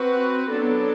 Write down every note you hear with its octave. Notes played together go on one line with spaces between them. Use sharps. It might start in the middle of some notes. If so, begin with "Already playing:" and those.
Already playing: C4 F#4 B4
F#3 B3 D4 A4